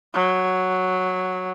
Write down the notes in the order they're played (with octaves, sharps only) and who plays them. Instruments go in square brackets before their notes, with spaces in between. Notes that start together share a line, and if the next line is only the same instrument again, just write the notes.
[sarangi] F#3